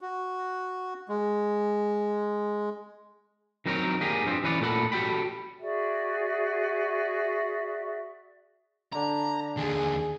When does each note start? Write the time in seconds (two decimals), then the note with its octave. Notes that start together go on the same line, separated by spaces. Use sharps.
0.01 F#4
1.09 G#3
3.66 D#3 F#3 C4 D#4 A#4 C#5
4.01 G3 A#3 G4 G#4 A#4
4.25 G2 F3 C4
4.44 E3 C#4 B4 C#5 D5
4.61 A#2 A3 A4 F#5 B5
4.92 F#4 G4 A4 G5 B5
5.60 F#4 G#4 D5 E5
8.93 D3 A#5
9.57 D#2 D3 G#4